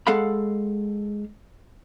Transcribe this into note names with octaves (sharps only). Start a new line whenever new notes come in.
G#3 A4 F5 F#5 B5